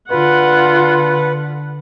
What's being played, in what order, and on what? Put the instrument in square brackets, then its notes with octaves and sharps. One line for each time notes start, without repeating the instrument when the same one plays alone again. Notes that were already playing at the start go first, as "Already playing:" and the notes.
[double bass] D3 [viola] F4 F#5 [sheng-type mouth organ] B4